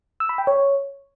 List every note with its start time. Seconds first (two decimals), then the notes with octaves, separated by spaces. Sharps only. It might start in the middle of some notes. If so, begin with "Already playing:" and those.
0.20 E6
0.29 B5
0.38 G5
0.47 C#5